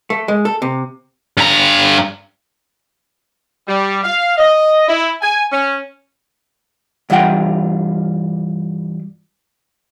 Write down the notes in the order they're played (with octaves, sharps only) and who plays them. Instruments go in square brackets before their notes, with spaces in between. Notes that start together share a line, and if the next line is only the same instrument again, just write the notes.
[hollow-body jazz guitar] A3
G#3
A4
C3
[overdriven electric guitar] G2 A#5
[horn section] G3
F5
D#5
E4
G#5
C#4
[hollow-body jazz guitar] G2 E3 G3 F4 F#5 G5